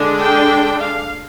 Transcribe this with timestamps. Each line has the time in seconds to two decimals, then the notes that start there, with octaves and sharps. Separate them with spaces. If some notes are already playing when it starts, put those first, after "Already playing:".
Already playing: D3 G#3 D4
0.19 G5
0.80 F5